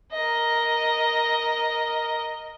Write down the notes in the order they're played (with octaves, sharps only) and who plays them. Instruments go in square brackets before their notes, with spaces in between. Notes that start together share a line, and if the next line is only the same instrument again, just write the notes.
[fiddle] A#4 D#5